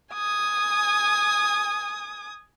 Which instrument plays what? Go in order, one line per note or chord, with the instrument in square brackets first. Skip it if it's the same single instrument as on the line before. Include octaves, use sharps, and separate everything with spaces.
[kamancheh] G#5 D#6